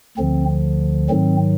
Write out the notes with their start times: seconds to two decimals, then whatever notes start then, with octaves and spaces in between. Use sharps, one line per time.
0.18 D2 D3 F3 C4
1.09 G#2 D#3 F#3 C4